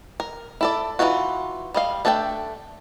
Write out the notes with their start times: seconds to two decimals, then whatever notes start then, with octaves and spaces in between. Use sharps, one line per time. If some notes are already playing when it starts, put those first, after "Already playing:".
0.20 A#4
0.61 E4 A4 D5
0.99 E3 G#3 D#4 F4 F#4
1.74 G3 D#5 F5
2.05 A3 D4 A4 C5 G5